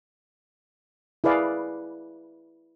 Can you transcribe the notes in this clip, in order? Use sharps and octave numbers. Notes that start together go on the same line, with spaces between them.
E4 G#4 B4 D5 F5